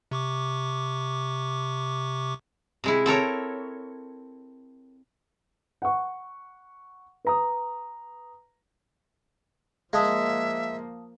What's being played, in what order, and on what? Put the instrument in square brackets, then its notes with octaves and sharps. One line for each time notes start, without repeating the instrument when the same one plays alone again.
[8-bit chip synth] C3 C#6 D6
[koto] C3 G#3 E4
C4 A4 A#4 C#5
[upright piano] F#5 C#6
B4 A#5 D#6
[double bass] F3 A#3 [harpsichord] G#3 [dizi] E5 [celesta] F5 A5 D#6